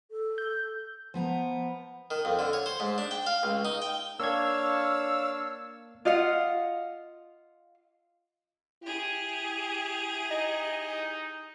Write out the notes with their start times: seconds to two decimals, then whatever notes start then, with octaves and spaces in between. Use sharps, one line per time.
0.11 A4
0.38 G6
1.14 F3 B3 G#5 A#5
2.11 D#3
2.25 F2
2.39 D3
2.53 C#5
2.66 C5
2.80 G#2
2.98 D4
3.11 G5
3.27 F5
3.43 C#2
3.65 D#4
3.82 G5
4.20 A#3 D4 C#5 F5 E6 G#6
6.05 F4 D#5 F5 F#5
8.83 E4 G4 G#4
10.31 D#4 D#5